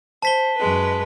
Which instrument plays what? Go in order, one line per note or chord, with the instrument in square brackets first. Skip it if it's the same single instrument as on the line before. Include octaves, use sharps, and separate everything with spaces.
[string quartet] C5 [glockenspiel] A5 B6 G7
[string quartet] F#2 G#3 B4